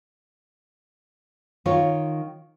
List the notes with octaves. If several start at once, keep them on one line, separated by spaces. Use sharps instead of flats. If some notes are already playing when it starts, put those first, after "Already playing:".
D#3 F4 C#5